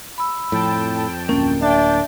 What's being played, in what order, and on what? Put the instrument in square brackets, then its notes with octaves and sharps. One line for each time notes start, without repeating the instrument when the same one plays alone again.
[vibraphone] B5 E6
[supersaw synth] F2 G5 A5 [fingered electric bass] A2
[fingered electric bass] D1 A#3 [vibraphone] C#4
[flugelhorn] D4 [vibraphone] E5 [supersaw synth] G5 A6